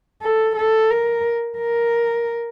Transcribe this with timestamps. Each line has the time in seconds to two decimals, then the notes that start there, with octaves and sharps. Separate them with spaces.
0.22 A4
0.56 A4
0.90 A#4
1.58 A#4